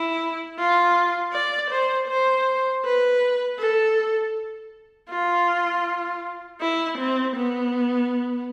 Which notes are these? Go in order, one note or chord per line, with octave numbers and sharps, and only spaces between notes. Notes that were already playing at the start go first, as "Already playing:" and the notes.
Already playing: E4
F4
D5
C5
C5
B4
A4
F4
E4
C4
B3